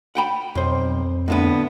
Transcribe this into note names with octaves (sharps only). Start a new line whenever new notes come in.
F#5 G5 B5
B1 F2 C5
A2 D3 B3